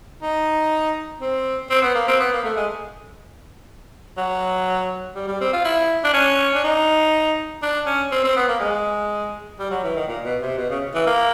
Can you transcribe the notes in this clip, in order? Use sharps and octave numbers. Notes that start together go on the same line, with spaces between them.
D#4
C4
C4
B3
A#3
C4
B3
A#3
A3
G#3
F#3
G3
G3
C4
F4
E4
D4
C#4
D4
D#4
D4
C#4
C4
C4
B3
A#3
G#3
G3
F#3
E3
D#3
A#2
B2
C3
B2
C#3
E3
A#3